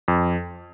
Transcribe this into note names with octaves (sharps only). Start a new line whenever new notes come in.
F2